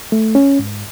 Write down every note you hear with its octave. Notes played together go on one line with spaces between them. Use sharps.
A3
C#4
G#2